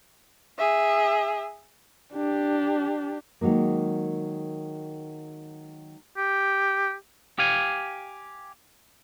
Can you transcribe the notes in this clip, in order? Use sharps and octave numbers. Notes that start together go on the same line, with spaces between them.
G#4 E5
D4 G4
D#3 F#3 G#3 A#3
G4
G4 F5 G#5